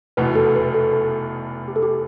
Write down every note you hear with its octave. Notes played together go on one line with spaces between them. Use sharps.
F1 E2 B2 B4
A4
B4
A4
A4
G4
A4
G4